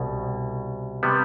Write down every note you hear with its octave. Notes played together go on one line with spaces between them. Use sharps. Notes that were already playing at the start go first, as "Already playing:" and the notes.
Already playing: C2 B2
C3 G3 B3